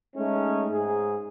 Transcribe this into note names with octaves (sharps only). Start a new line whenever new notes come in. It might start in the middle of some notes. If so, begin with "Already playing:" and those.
G#3 A3 C#4 D#4
G#2 G#4